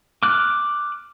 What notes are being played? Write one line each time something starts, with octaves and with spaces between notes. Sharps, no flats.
D6 F6 F#6